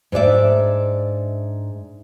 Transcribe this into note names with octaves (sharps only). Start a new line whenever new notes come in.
G#2 D4 D5 E5